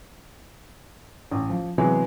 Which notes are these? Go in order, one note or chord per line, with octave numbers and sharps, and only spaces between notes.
A1
F3
C3 E3 F#3 G#3 B3 G#4